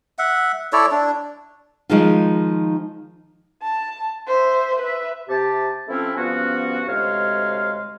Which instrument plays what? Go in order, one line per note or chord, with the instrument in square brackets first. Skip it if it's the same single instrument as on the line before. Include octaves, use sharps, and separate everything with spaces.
[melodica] E5 F#5
E4 A4 C#5 D5
D4
[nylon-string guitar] D#3 F3 G#3 D#4 F4
[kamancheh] A5
C5 E5
B4 E5
[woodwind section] C3 G4 A5
F3 A3 C4 C#4 E4
G2 F3 B3 C#4 F#4
D2 C3 G#3 C#5 F5